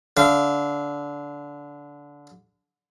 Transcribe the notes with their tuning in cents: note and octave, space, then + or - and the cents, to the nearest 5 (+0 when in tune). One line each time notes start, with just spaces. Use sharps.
D3 -20 F5 -25